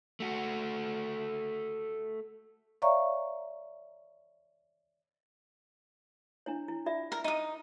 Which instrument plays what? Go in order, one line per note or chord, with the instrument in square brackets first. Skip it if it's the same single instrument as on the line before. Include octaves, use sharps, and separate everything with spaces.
[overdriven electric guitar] A3 F#4
[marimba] C#5 D5 E5 F5 A#5 C#6
[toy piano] D4 E4 C#5
E4
F4 D5 E5
[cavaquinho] A#4
D#4 D#6